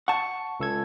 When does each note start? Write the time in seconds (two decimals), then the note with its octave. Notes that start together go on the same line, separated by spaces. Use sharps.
0.08 F#5 A5 C#6
0.60 C#2 A4 G#6